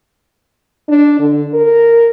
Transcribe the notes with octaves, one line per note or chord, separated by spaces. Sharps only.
D4
D3
A#4